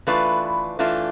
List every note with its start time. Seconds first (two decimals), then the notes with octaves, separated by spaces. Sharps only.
0.07 E3 A3 D4 F4 B4
0.79 E3 A3 D4 F4